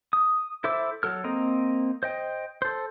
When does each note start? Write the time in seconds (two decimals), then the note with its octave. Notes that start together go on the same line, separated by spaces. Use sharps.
0.13 D#6
0.64 E4 A4 C5 E5 D6
1.03 F#3 A4 F6
1.24 A#3 C4 D#5 A#5
2.03 C5 D#5 G5
2.62 A4 C5